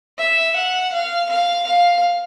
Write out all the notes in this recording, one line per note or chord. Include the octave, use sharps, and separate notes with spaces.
E5
F#5
F5
F5
F5